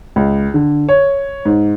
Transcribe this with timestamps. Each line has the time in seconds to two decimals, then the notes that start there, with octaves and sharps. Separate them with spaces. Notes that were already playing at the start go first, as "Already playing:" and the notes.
0.16 C#2
0.54 D3
0.89 C#5
1.45 G#2